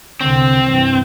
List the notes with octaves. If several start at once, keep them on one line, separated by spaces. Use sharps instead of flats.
C2 D3 C4
G2 E3